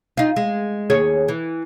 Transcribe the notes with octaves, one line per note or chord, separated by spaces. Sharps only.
D#4 F4
G#3
D#2 G#4 C#5
E3